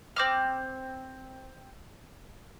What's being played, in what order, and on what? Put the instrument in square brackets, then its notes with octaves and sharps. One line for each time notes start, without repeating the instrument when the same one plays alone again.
[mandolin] C4 D6 F6